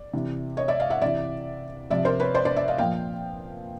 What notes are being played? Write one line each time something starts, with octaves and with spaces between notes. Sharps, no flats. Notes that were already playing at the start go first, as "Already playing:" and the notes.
Already playing: D5
C3 E3
C#5 D#5
D5 E5
D#5 F5
E5 F#5
C3 E3 D5 E5
C3 F3 D5 E5
A#4 C5
B4 C#5
C5 D5
C5 D5
D5 E5
D#5 F5
A#2 F3 F5 G5